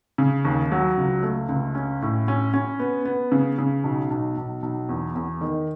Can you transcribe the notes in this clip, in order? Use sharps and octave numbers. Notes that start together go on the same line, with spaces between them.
C#3
D#2
F#3
C#2
A3
C#2
C#4
A2
C#4
C#4
B3
B3
C#3
C#3
B1
B1
B1
B1
E2
E2
D#3